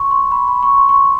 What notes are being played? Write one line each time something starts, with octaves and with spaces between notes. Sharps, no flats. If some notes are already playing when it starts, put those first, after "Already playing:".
Already playing: C6 C#6
C6
B5
B5
C#6
C6
C#6
C6